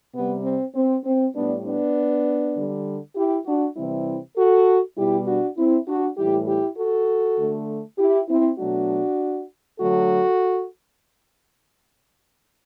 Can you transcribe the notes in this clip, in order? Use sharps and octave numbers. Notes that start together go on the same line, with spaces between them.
C3 G3 B3
C4
C4
C4
A2 G3 B3 D4
B3 D4
D3 G3
E4 G4
D4 F#4
C3 E3 G3 C4 E4
F#4 A4
B2 G3 E4 G4
D4 F#4
C4 E4
D4 F#4
A2 E3 G3 E4 G4
E4 G4
F#4 A4
D3 A3
E4 G4
C4 E4
B2 F#3 A3 D4 F#4
D3 F#3 A3 F#4 A4